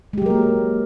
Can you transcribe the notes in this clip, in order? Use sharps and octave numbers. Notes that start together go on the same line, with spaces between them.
F#3 G#3 A#3 G4 A#4